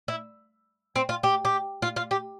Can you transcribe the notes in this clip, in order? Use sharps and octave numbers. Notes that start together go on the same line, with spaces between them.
E4
C4
F4
G4
G4
F4
F4
G4